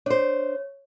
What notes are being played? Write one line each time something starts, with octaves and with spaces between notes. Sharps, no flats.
D4 C5 C#5